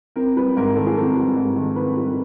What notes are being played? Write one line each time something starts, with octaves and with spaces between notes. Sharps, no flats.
C4 A#4
G3 B4
G#2 A#4
D#3 A4
G#4
C4 A4
G3
G#2
D#3
C4 B4
G3